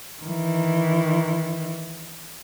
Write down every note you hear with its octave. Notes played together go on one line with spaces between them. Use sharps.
D#3 E3